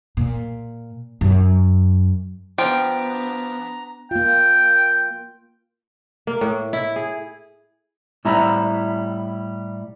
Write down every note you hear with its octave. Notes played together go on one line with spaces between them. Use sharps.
A#2
F#2
F3 B3 D4 G5 A#5
A#3 F4 G5
A#3
A2
E4
G#4
A2 G3 E4 E5 A#5